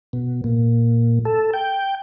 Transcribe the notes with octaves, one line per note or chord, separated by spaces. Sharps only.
B2
A#2
A4
G5